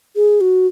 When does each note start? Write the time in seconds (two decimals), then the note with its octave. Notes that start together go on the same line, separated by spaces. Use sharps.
0.16 G#4
0.41 F#4